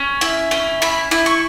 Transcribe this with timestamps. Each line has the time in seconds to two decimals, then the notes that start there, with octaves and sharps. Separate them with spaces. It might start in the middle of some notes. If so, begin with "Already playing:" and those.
Already playing: C#4
0.21 E4
0.51 C#4
0.82 E4 B5
1.11 E4
1.26 C#6